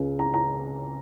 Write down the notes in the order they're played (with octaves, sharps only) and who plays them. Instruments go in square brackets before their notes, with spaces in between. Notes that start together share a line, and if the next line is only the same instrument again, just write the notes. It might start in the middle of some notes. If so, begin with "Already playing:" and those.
Already playing: [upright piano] C#2 C#3
A#5
A#5